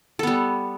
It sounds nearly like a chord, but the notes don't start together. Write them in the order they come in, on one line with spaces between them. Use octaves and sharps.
A4 B3 G3